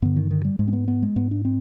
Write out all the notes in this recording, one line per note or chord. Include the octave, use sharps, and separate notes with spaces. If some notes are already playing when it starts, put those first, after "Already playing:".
G2 D3 B3
D#3
D#3
G3
G#2 G#3
C4
B3
B3
G#3
G#2 B3
D4
C4